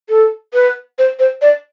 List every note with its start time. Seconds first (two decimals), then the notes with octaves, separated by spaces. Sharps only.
0.09 A4
0.54 B4
0.98 C5
1.19 C5
1.42 D5